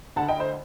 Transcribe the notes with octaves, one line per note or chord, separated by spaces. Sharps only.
D2 D3 F#5 A5
D#5 G5
C5 D#5